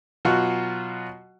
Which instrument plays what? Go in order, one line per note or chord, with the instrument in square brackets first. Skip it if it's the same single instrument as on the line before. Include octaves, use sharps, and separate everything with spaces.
[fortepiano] B2 F#3 F4 F#4